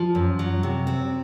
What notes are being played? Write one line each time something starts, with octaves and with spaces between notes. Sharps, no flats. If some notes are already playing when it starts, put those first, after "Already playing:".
Already playing: F3
F#2
F#3
C3
C4